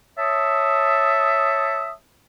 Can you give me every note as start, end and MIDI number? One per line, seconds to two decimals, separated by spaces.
0.18 1.94 73
0.18 1.92 76
0.18 1.94 81
0.18 1.94 87